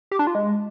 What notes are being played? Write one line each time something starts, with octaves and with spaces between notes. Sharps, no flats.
G4
D4
F4
G#3